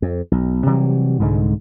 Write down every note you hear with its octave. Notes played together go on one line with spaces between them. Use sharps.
F2
B1
C3 E3 F#3 G3
C2 G#2 D3 G#3